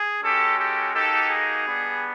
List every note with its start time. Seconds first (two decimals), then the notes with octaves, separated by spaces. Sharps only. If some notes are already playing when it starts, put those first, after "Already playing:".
Already playing: G#4
0.23 G#3 C#4 F#4 G4 A4
0.59 G4 A4
0.94 A#3 D#4 F#4 G4 A4
1.30 G#4
1.66 G3 B3 D4